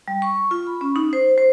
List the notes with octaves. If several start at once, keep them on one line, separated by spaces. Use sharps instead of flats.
G3
C#6
F4
B5
C#4
D#4
C5
C5